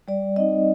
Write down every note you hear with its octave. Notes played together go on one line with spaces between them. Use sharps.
G3 D5
C4 D#4 D#5